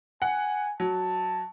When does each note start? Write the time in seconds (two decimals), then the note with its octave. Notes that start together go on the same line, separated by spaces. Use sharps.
0.22 F#5 G#5
0.80 F#3 A5